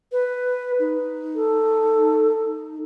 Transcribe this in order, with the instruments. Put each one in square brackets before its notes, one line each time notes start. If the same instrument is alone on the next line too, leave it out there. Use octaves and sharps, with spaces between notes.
[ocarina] B4
D#4
[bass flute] A4